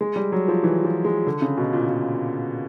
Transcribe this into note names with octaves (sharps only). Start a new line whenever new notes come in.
G#3
G3
F#3
F3
E3
F3
G#3
D3
C#3
B2
A#2
A#2